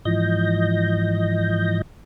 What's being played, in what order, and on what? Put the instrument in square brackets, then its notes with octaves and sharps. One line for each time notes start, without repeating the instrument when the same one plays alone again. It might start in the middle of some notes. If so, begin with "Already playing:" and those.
[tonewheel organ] G#2 E3 F3 D#5 G6 A#6